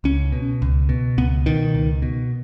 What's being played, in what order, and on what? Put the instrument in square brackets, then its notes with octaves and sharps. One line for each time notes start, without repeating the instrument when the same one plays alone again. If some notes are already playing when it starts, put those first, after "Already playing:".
[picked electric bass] C#2 C#4
B2
C#2
B2
C#2 B3
B2 D#3
C#2
B2